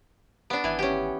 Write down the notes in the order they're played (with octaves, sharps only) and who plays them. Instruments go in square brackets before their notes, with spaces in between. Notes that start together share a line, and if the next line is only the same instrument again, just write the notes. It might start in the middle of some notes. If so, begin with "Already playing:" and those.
[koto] B3 D4
[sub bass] G#1 [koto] E3 G#5
[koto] C#4 G4